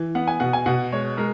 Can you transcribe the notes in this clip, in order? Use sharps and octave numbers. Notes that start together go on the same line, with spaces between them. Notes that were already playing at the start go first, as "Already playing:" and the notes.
Already playing: E3
B3 F#5
G#5
B2 F#5
G#5
B2 F#5
G#3 C#5
G#3 A#4